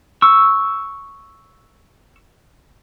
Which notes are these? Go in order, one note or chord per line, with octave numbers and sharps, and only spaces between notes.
C#6 E6